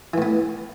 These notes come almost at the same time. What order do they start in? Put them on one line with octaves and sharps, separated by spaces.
E3 A2 B3